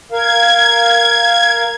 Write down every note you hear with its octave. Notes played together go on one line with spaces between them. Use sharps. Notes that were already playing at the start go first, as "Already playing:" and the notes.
A#4 F5 G#6